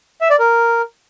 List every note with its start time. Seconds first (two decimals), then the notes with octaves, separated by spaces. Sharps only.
0.21 E5
0.30 D5
0.39 A#4